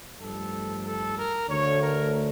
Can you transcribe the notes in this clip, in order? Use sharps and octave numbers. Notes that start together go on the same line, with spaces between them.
G2 F3 A3 A4
A4
A#4
D2 D3 A3 C#5
A#4